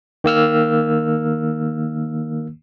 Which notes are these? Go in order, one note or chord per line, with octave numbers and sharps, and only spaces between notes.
D#3 A#3 E6 F6